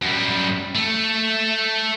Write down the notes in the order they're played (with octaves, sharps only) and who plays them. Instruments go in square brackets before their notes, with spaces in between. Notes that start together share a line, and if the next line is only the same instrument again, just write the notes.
[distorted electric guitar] F#2 G3
A3